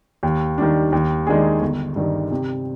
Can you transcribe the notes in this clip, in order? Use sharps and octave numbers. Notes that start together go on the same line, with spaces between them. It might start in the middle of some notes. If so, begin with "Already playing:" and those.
D#2
D#3 G3 D4
D#2
D#3 G#3 D4 G#4
G1
G2 D#3 G3
C3